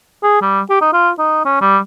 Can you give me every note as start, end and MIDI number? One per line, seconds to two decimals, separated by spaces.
0.23 0.39 68
0.41 0.61 55
0.70 0.81 67
0.81 0.93 63
0.93 1.10 65
1.19 1.41 63
1.45 1.60 61
1.61 1.78 55